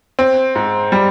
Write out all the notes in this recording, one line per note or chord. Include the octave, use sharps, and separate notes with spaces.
C4
G#2
G3